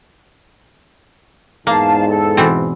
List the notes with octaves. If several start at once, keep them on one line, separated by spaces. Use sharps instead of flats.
E2 G#2 A#3 F5 A5
A4
B2 E3 C4